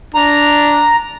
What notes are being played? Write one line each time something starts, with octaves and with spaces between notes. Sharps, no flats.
D4 A#5